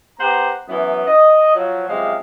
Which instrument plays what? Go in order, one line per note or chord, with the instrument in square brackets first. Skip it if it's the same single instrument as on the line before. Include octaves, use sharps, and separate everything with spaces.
[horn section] B3 G4 C5 F#5 A#5
F#2 E3 B3
D#5
F3 F#3
F#2 C3 F3 G#3 G#4 F5